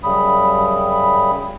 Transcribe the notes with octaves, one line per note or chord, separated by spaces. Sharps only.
F#2 C#3 G3 B5 D#6